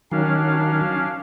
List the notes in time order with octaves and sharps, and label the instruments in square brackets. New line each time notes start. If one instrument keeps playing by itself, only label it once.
[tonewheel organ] D#3 F#3 [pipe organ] C#4 D4 F5